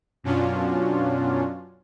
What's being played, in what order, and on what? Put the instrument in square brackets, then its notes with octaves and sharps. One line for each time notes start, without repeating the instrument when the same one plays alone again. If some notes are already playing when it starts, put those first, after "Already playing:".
[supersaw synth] F#2 B2 F#3 C#4 D4 F4